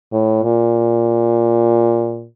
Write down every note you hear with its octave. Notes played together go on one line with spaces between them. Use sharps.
A2
A#2